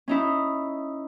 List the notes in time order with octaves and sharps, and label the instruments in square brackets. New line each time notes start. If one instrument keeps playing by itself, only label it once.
[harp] C#4 D#4 E4